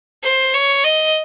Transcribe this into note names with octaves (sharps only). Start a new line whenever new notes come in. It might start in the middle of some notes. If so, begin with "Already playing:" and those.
C5
C#5
D#5